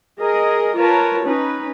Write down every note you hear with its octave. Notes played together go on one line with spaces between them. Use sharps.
G#4 A#4 D#5
F4 A#4 B4 C#5 A5
C#4 D#4 B4